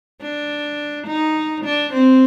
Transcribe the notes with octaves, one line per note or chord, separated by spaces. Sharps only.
D4
D#4
D4
C4